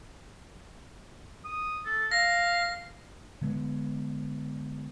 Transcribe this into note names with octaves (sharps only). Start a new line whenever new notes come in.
D#6
A4
F5 A#6
D3 G#3 B3